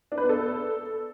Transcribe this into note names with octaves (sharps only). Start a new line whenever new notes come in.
D4
B4
B3
A4